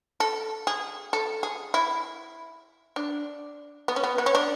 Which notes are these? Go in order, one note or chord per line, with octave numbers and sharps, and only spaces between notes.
A4
G#4
A4
G#4
E4
D4
B3
C#4
B3
B3
C#4
D4